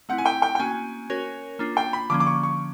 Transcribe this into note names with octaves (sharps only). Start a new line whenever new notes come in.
A3 C4 E4 F#5
G#5
G5
G5
G5
A#3 C#4 F#4 G#5
C#4 F#4 A#4 C#5
A#3 D4 F4
G5
B5
D3 F3 A#3 C#4 D6
D6
C#6
C#6